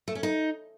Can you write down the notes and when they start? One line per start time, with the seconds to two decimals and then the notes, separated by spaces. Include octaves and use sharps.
0.08 A3
0.15 C#4
0.23 D#4